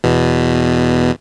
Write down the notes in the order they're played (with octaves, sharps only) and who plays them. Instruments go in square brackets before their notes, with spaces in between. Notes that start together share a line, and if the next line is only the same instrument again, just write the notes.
[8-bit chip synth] E2 B2